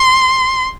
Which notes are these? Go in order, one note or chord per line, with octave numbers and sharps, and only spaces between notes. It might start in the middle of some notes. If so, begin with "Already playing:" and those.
Already playing: C6